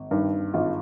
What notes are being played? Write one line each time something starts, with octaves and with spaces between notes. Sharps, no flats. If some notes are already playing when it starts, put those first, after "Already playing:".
Already playing: G#1
G2 D#3
G#1 F4